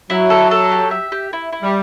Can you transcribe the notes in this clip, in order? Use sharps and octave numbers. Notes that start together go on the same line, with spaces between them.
F#3 E4
A4
A4
G4
E5
G4
E4
E4
G3